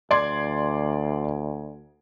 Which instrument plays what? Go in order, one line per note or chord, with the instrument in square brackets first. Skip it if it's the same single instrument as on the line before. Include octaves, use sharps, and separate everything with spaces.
[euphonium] D2 [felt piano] D5 C6 G#6